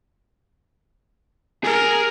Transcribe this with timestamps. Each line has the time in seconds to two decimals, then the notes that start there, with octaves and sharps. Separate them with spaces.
1.64 G#4 A#4